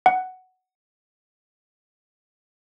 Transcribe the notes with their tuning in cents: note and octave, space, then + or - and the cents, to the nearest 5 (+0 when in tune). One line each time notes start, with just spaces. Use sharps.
F#5 +5